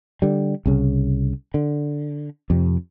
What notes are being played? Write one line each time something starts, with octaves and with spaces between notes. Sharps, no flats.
D3 G3
C2 C#3
D3
F2 C3